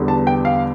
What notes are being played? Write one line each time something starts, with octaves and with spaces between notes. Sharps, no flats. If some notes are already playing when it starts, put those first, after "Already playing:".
Already playing: E2 D3 G3 B3
A5
G5
F5